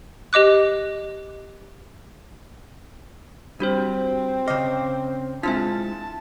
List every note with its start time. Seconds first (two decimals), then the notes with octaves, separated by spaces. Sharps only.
0.33 G4 D#5 D6 F#6
3.60 G3 C4 D4 F#4 C5
4.48 C#3 D#5 D6 F6 C7
5.43 G#3 C4 D4 E4 F4 E5 A5